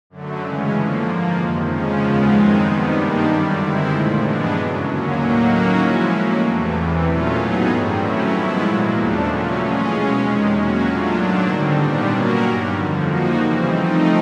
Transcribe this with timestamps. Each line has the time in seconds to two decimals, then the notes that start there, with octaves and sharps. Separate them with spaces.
0.10 F#2 D3 F#3 A3
0.42 C#3 E3 G#3 C#4
0.72 D3 F3 A#3
1.04 G#2 F3 A#3
1.36 F2 C3 D#3
1.67 C#3 F3 G#3 C#4
1.99 D#2 C#3 F3 G#3 B3
2.30 F#2 D#3 G#3 C4 D#4
2.62 C3 D#3 G3 B3
2.93 G2 D#3 G3 A#3 D4
3.26 F#2 D3 G3
3.57 C3 D#3 G#3 C4 E4
3.88 A#2 F3 A3
4.20 G2 E3 G#3 B3 D4
4.52 F#2 C#3 F#3
4.83 D#2 D3 F#3 A#3 C#4
5.15 A2 F#3 A#3 D#4 F#4
5.47 D#3 F#3 A#3 C#4 F#4
5.78 F3 G#3 C#4 E4
6.09 A2 F#3 A#3
6.41 E2 C3 E3 A3
6.73 E2 C3 E3
7.05 A#2 F#3 A3 C#4 F4
7.36 A2 F#3 B3 D#4 G#4
7.68 G2 D#3 G3 C4
7.99 F#3 A3 C#4 E4
8.31 G#2 F3 G#3 B3 E4
8.62 A#2 F#3 A#3
8.94 D#2 C#3 F3 A3 D4
9.25 A#2 F#3 A3 C#4
9.57 E3 G#3 C#4 F4 G#4
9.88 B2 G#3 C#4
10.20 E2 C3 D#3 G#3
10.51 F#3 A#3 C#4 F#4
10.83 A#2 F#3 A3 D4 F4
11.15 G#2 D#3 F#3 A#3 D4
11.46 D3 G3 C4 D#4
11.78 A#2 G3 B3 D4
12.09 F#3 A#3 C#4 F#4 A#4
12.40 G2 D#3 G3
12.72 F2 D3 F3
13.04 F3 A#3 D#4 F#4
13.35 C#3 E3 G3 C4
13.67 F3 A3 C4 D#4